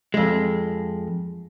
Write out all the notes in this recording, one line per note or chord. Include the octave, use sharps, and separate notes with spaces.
F2 G#3